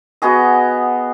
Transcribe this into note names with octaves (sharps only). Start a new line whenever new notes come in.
B3 F#4 G#4 D#5